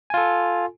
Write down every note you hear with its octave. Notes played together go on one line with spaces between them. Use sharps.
F4 A4 G#5